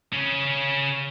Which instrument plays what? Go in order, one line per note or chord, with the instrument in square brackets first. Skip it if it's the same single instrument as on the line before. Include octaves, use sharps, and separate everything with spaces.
[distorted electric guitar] C#3 C#4